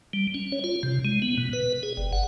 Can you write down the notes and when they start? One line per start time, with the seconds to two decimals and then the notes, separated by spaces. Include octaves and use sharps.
0.13 G3
0.34 C#4
0.52 C#5
0.64 F4
0.83 C3
1.05 G#3
1.22 B3
1.38 B2
1.53 B4
1.83 G#4
1.97 G1
2.13 F#5